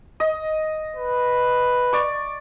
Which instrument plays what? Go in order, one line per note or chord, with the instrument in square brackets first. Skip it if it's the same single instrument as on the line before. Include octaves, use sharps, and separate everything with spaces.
[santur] D#5
[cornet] B4
[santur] D5 C#6